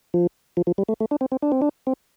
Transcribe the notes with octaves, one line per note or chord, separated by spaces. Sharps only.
F3
F3
F3
G3
A3
A3
D4
C4
C4
D4
C4
D4
C4